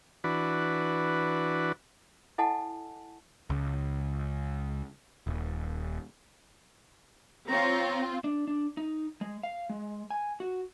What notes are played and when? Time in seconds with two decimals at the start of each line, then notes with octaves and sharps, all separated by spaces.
0.24 E3 D4 F#4 B4
2.38 E4 A4 D#5 F#5 G#5 A5
3.50 C#2
5.27 D#1
7.48 C4 F4 C#5 A#5
8.24 D4
8.47 D4
8.77 D#4
9.21 G#3
9.43 F5
9.70 G#3
10.10 G#5
10.40 F#4